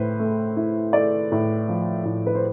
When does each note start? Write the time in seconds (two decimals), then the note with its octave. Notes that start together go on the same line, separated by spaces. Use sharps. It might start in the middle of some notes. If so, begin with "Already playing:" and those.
Already playing: A2 A3 B4 C5
0.19 A3
0.57 E4
0.93 A3 D5
1.32 A2
1.69 F3
2.05 A2
2.27 B4
2.35 C5